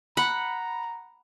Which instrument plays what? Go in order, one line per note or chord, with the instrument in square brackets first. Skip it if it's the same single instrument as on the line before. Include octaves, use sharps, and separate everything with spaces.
[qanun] F#5 [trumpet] A#5 [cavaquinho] B5